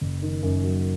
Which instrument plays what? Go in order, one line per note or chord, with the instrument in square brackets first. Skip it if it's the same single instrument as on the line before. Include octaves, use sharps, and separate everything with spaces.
[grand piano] F#1
D#3
F#2
F#3